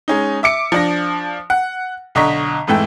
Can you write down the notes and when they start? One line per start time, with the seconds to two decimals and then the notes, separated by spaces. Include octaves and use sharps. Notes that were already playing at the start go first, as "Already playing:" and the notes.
0.08 G#3 C#4 D#4
0.43 E5 D6 C#7 D7
0.72 F3 D4 A#6
1.50 F#5
2.15 B1 D3 D#5 A#5 C#6 B6
2.67 F2 G#2 E3 A3 G5 E6